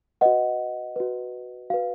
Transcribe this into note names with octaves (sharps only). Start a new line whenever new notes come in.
F#4 B4 D#5 F#5
F#4 B4
F#4 B4 F5